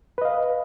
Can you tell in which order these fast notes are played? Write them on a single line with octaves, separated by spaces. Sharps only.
B4 D#5 F5